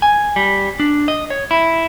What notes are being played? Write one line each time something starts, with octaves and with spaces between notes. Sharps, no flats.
G#5
G3
D4
D#5
C#5
E4